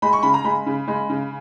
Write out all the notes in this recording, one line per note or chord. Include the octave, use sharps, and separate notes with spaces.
G#3 B5
C#6
C#3 B5
A#5
G#3 B5
C#3
G#3
C#3